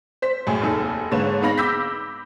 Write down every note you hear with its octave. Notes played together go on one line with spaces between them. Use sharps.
C5 B6
F#2 A2 G#4
F1 D#2 D#4 G#4 A4
G#2 D3 A#3 B4 C#5 E7
B3 D#4 F5 B5 A#6
B5 D6 E6 G6 A#6 B6